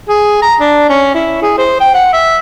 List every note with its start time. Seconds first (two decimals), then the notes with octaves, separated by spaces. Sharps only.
0.09 G#4
0.42 A#5
0.60 D4
0.89 C#4
1.14 E4
1.42 G#4
1.58 C5
1.81 G5
1.94 F#5
2.13 E5